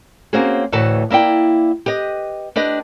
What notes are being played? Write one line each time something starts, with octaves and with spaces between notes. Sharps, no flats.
A#3 C4 C#4 F#4 G#4
D2 A2 E3 F#4 B4 A5
A#3 E4 D5 G5
G4 B4 D#5
D4 G4 B4 D#5